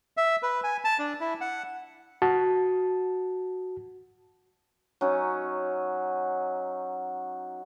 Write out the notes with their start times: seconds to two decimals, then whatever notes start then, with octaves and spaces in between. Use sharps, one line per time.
0.17 E5
0.42 B4
0.63 G#5
0.85 A5
0.99 D4
1.20 E4
1.41 F#5
2.22 F#4 A5
5.01 F#3 C#4 D#4